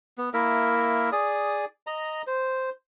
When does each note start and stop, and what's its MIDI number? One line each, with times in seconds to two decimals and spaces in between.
0.18 0.30 59
0.34 1.10 58
0.34 1.10 64
0.34 1.10 70
0.34 1.10 76
1.12 1.65 68
1.12 1.65 74
1.12 1.65 87
1.87 2.22 75
1.87 2.22 82
2.27 2.70 72